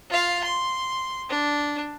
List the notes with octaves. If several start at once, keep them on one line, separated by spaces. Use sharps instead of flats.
F4 F5
C6
D4